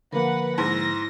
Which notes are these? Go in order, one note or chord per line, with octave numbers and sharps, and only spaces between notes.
D3 F3 A#3 A#4 B4 F#5
G#2 E4 E6 A#6